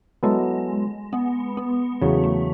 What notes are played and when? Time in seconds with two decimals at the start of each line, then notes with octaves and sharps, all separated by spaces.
0.23 F#3 G#3 B3 E4 A4
1.13 B3
1.57 B3
2.02 E2 C#3 F#3 A3
2.24 A3